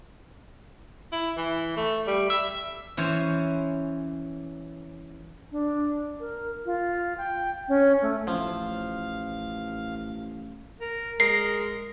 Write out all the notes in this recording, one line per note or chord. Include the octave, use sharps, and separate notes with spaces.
E4
E3
A3
G3
E5
E3 C#4 C5 C#5
D4
A#4
F4
G5
C#4
A3
A1 F3 F5
A#4
G#3 A#4 C7